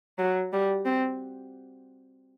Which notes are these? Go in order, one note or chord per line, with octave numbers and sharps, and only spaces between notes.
F#3
G3
C4